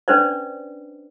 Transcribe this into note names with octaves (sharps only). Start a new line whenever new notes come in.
C#4 D4 B4 C5 D5